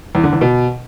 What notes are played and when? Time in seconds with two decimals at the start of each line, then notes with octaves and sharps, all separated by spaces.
0.15 E2
0.24 D3
0.32 E2
0.41 B2